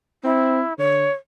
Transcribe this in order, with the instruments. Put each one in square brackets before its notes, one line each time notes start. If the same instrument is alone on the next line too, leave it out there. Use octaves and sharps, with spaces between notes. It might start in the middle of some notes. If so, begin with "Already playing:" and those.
[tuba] C4 [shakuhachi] E4
[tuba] D3 [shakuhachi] C#5